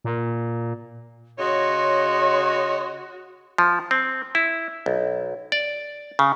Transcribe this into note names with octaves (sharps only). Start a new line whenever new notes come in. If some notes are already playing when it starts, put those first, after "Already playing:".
A#2
C#3 F#4 C#5 D#5 C6
F3
C4
E4
B1
D5
C#3